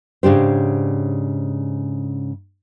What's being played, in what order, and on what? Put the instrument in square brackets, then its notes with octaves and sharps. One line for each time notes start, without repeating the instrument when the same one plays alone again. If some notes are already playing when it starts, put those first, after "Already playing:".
[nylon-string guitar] G#2 C#3 D4 G4 C5